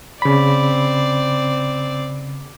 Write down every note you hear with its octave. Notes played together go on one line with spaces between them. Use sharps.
C#3 C4 D5 B5